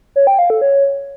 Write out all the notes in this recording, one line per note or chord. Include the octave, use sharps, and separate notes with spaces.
C#5
G5
F5
A4
C#5